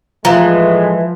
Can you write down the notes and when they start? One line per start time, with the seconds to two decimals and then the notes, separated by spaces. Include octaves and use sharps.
0.25 A2 E3 F3 G#3 F5 A#5